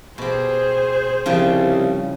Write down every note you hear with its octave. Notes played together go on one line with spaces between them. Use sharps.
B2 G4 G#4 C5
C2 C#3 F3 G3